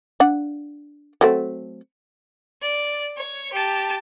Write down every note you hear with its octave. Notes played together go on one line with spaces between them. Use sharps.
D4 F#5
F#3 A3 C4
D5
C#5
G4 A5